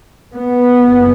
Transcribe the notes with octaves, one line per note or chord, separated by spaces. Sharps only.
B3
F#1